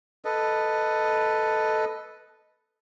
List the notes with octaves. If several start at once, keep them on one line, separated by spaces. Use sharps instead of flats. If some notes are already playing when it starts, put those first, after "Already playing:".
A4 B4 D#5